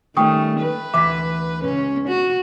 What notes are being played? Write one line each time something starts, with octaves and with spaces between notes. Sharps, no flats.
D#3 G3 A3 C#4 G5 C#6 D#6
B4
D2 E3 E5 D6 B6
C#2 G#2 C#4
F#4